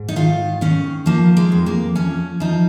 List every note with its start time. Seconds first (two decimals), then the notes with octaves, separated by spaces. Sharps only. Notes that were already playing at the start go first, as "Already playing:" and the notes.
Already playing: G#2
0.08 D#4
0.16 D#3 F4
0.61 D#3 C#4
1.06 F3 A#3
1.37 G#3
1.52 F2
1.66 A#3
1.95 F3 C#4
2.40 F3 D#4